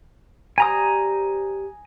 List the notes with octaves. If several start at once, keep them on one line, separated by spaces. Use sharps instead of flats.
G3 G4 C5 G#5 A#5 D#6